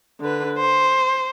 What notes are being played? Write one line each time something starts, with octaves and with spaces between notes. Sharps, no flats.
D3 B4
C5